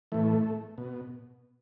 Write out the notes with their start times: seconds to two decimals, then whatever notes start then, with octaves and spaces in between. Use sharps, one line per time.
0.12 A2 E3 A3
0.78 B2